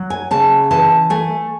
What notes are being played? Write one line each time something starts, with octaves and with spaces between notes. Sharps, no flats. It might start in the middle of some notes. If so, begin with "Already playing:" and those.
Already playing: F#3
G#5
C#3 A5
E3 A5
A3 G#5